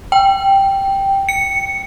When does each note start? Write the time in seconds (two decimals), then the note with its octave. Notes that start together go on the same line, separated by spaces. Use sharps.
0.12 G5
1.29 C#7